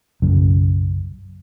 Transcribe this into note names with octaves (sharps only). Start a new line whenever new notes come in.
B1 F#2 C#3